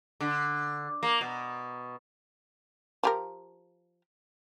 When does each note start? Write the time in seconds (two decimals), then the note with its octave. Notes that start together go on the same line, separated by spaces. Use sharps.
0.20 D3
1.03 A#3
1.21 B2
3.03 F3 G4 A#4